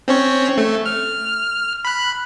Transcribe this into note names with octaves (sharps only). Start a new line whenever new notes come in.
C4 C#4 C#5
A3
F6
B5 F#6